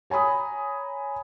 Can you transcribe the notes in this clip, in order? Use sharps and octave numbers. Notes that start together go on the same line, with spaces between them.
C#5 G#5 A#5 B5 D#6